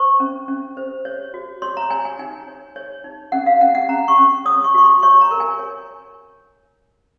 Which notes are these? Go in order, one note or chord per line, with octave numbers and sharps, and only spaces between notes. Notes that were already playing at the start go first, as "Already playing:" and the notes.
Already playing: C5 C#6
C#4
C#4
C5
C#5
F#4
C#5 C6
A#5
C#5 G#5
G#5
D#4 G#5
C#5
C#5
D#4
C#4 F#5
F5
C#4 F#5
F#5
C#4 A#5
C#6
C#4
C#5 D#6
C#6
F#4 C#6
C6
C#5 C#6
A#5
A#4
G#5
C#5